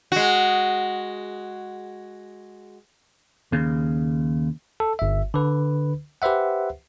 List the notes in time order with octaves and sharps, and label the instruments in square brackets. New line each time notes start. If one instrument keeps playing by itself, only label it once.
[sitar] G#3 F#4
[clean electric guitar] D#2 C#3
[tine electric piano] A4
G1 E5
D3 B4
G4 B4 C5 E5 F#5